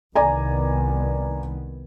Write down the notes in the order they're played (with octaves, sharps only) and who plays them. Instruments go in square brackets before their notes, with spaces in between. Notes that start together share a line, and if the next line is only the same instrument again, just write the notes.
[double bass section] C2 D#3 B3 [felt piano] D5 G#5 A#5